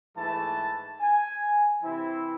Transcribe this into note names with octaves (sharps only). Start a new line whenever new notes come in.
G#2 E3 A3 A5
G#5
C3 E3 C4 E4